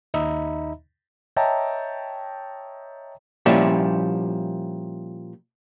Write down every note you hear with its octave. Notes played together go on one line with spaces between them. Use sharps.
D#2 D#4 D#5 E5 A#5 B5
C#5 D#5 E5 G5 A5 A#5
A#2 F3 G3 C#4 E4